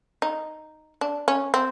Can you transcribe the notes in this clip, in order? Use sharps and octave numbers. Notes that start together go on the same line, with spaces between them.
D#4
D4
C#4
C4